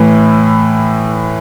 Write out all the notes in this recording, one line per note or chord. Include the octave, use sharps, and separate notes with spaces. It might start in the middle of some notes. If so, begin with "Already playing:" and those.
Already playing: A2 E3